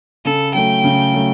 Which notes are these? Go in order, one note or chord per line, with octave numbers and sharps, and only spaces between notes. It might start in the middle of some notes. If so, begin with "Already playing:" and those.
C#3 A4
F#3 A3 G5
C#3
F#3 A3